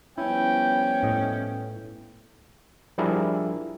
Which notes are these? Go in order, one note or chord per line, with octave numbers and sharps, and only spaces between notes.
F3 G3 B3 C#4 E4 G5
A2 D#5
F3 G3 D4 E4 G#4 A#4